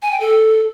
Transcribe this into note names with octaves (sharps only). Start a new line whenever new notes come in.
G#5
G5
A4